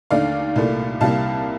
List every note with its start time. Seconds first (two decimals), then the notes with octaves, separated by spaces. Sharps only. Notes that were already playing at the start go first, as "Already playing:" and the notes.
0.10 D#2 D3 A3 D5 F5
0.56 C2 A#2 A3
1.01 C2 C3 G3 A#3 F5 A5